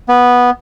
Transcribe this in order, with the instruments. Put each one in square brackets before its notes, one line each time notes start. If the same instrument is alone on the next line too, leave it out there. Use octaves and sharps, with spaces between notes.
[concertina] B3